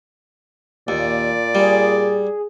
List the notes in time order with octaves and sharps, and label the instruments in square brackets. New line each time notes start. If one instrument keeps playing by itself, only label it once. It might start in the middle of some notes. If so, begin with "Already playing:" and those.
[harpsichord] D#2 [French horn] A#2 [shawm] D5
[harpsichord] G3 [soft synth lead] G#4